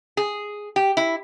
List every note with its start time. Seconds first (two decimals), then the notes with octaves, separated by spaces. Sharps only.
0.17 G#4
0.76 G4
0.97 E4